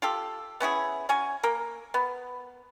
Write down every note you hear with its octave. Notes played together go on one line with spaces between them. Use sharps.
F4 G4 A4
B3 C#4 E4 G#4
C#4 F#4 G#5
A#3 A#4
B3